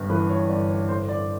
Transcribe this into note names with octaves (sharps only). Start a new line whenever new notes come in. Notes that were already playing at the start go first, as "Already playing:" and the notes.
Already playing: G1 G2
E3 B4
C#5
G1 D5
C#5
A2 C5
D5